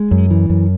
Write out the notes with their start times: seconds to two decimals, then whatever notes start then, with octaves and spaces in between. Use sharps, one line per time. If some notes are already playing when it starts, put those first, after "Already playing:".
Already playing: G#3
0.11 F#2
0.31 E3
0.50 F#2